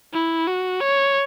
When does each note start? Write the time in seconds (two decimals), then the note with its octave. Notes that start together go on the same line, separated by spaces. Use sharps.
0.13 E4
0.47 F#4
0.81 C#5